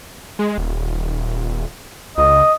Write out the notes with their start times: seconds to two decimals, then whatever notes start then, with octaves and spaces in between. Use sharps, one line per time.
0.39 G#3
0.58 D#1
2.18 C#2 D#5